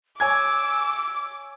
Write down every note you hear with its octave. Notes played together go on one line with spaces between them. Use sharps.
C#5 G#5 D6 E6 G#6